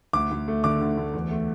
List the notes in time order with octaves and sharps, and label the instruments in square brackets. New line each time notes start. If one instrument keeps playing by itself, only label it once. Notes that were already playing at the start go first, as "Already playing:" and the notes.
[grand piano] D2 D6
D2
A3
D3 D6
D2
D2
E2
A3